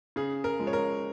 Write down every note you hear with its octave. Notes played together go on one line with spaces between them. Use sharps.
C#3 G#4
A#4
F3 G#3
C#5
A#4